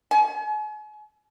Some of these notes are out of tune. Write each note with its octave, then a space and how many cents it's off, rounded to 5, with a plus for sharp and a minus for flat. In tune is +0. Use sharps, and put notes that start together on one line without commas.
G#5 +40